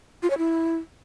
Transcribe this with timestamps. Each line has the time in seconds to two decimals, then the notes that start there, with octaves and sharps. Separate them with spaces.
0.23 F4
0.30 C#5
0.38 E4